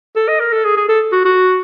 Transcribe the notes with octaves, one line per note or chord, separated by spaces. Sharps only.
A4
D#5
A#4
A4
G#4
G#4
A4
F#4
F#4